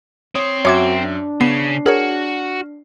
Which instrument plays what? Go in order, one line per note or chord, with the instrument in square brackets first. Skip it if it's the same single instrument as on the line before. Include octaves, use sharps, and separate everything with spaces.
[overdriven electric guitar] C4 C5 [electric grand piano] C#5 D#6
[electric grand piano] F#2 E5 [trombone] F#4 [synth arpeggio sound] C#5 D6 G#6
[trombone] D4
[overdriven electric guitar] C#3 [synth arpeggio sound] B3 [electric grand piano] C7
[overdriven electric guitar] F#4 [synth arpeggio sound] G#4 A#4 C#5 [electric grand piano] F6